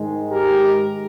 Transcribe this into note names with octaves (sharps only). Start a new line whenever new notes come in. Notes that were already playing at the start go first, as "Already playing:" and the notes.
Already playing: G#2 D#3 G#3
G4 A#4